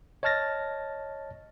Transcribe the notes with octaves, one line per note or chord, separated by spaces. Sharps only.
C#5 D#5 A5 F6 A6 A#6